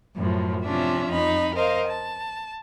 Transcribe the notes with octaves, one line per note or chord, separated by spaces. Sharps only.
F#2 A2 F3
C3 F3 C#4 D4 F4 E5
F2 D#4 B5
A#4 C5 D#5 F5
A5